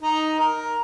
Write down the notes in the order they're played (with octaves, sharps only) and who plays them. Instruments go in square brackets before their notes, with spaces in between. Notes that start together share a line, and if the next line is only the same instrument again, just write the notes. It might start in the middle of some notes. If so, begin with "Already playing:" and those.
[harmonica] D#4
A#4